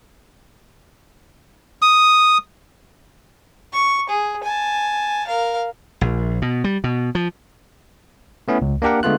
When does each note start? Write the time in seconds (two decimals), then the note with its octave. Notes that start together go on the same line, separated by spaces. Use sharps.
1.82 D#6
3.73 C#6
4.09 G#4
4.43 G#5 A5
5.27 A#4 F5
6.01 A#1
6.42 B2
6.64 G3
6.84 B2
7.15 F3
8.48 A3 B3 C#4 E4
8.62 C#2
8.82 A#3 D4 G4 A#4 F#5
9.03 D3 G#3 A3 B3 F4 F#6